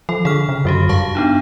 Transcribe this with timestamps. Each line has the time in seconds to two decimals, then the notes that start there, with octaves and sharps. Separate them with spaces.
0.09 F3 A4
0.25 D3 G#4 F6
0.49 C#3
0.65 F#2 D3 F#4 G4
0.89 G2 F5 A5 C#6
1.15 B3 D4 D#4